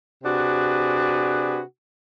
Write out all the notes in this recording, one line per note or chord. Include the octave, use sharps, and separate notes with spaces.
C3 D4 F#4 G#4 B4